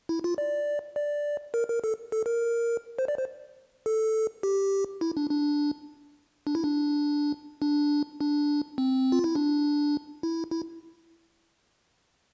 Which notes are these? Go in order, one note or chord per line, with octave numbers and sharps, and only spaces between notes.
E4
F4
D5
D5
A#4
A#4
A4
A4
A#4
C5
D5
C5
A4
G4
E4
D4
D4
D4
E4
D4
D4
D4
C4
F4
E4
D4
E4
E4